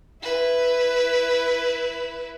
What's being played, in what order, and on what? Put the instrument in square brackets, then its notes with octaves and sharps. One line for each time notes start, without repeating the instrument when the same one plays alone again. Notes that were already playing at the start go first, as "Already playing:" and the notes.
[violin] E4 B4